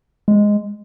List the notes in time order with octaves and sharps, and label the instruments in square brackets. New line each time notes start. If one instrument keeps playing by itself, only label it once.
[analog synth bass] G#3